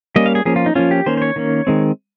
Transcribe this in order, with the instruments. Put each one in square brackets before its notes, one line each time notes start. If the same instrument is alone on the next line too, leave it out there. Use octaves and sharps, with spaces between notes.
[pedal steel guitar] G3 A#3 C#4 D#5
F5
G#4
F3 A#3 C#4 G#4
F4
D#4
F3 A#3 C#4 F4
G4
D#3 A#3 C#4 C5
C5
C#5
D#3 A#3 C#4
D#3 G#3 C4